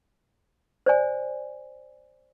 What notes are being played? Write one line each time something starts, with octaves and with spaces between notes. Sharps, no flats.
C5 D5 G#5